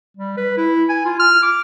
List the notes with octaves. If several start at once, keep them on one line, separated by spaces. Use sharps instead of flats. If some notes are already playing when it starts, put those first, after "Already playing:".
G3
B4
E4
G#5
F4
F6
D6